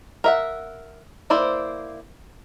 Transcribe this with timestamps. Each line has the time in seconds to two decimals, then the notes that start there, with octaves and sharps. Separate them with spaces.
0.24 A#4 E5 F#5
1.30 A#3 E4 C5 D5